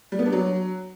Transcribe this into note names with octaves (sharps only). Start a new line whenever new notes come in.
G3
B3
D4
F#3